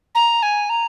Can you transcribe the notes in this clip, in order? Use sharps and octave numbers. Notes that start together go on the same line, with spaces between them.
A#5
G#5
A#5